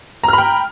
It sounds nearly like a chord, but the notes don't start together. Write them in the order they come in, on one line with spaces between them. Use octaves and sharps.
A#5 F6 B5 G5